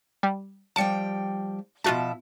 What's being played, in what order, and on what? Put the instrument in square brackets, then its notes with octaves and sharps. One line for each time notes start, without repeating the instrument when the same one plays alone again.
[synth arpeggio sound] G3
[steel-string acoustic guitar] F3 G3 G5 [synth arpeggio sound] A5 C#7
[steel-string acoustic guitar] B2 F3 E5 [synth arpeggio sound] F4 F#4 A5